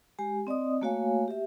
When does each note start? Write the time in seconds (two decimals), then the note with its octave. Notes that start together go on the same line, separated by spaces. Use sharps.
0.19 G#3 G4 G#5
0.47 C4 D5 D#5 D#6
0.81 A3 A#3 F#4 C#5 F5 G#5
1.28 G4 E5